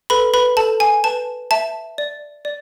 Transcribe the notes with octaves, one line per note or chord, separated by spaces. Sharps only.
A4 B4 B5
B4 B5
A4 A5
G#5
B4 A5
E5 A5
D5
D5